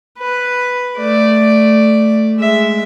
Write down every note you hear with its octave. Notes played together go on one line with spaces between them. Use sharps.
B4
A3 D5
G#3 E5